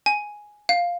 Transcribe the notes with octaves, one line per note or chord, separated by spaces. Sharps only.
G#5
F5